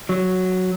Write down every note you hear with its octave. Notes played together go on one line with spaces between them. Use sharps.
F#3